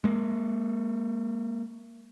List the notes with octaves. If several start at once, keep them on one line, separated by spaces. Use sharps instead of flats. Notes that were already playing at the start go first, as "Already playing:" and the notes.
G#3 A#3